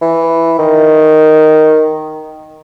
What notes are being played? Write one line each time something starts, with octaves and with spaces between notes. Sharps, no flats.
E3
D#3